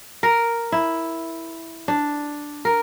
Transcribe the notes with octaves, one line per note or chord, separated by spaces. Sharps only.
A#4
E4
D4
A#4